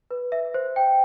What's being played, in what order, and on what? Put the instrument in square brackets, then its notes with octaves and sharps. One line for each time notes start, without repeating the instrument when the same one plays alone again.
[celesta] B4
E5
C5
G5